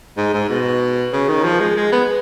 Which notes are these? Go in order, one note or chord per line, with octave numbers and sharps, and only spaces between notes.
G#2
G#2
B2
C#3
D#3
F3
G#3
G#3
B3